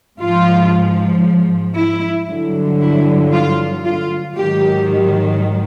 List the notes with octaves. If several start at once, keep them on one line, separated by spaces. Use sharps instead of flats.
G#2 F3 F4
E4
G2 D3 F#3
E4
F4
F4
G#2 D#3 F#3 G4